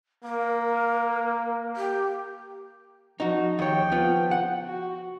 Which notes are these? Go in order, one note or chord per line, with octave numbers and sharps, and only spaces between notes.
A#3 A#4
G4
F3 D#4 F#4
D#2 C#5 G5
B3 F4
F#5
F#4